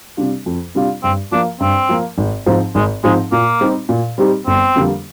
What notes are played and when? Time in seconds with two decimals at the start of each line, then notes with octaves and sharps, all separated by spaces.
0.17 C3 G3 D4 F4
0.46 F2
0.75 C3 G3 D4 F4
1.03 G2 C4
1.32 F3 A#3 D4
1.60 G2 C4
1.89 F3 A#3
2.18 G#1
2.46 G#2 F3 C4 D#4
2.75 G#1 G#3
3.04 G#2 F3 G#3 C4 D#4
3.32 A#2 A#3
3.61 G3 C4 D#4 G4
3.89 A#2
4.18 G3 C4 D#4 G4
4.47 G1 C4
4.76 F2 D3 G3 A#3